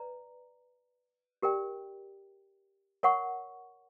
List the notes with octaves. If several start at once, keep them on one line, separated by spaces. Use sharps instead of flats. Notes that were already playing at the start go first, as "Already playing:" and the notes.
Already playing: B4 D5 A#5
G4 A#4 D5 G5
A#4 C#5 F#5 C#6